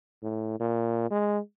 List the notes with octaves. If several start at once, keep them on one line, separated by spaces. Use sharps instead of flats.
A2
A#2
G#3